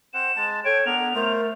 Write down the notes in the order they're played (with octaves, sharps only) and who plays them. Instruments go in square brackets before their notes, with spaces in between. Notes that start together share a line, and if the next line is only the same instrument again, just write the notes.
[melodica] C4 C5 F#5 [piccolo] E7
[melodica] G#3 A5
[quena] A4 [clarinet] C#5 [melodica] G5 [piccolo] D7
[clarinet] B3 [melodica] D4 A#4 [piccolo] F7
[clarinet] A3 [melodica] F4 C5 [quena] A#4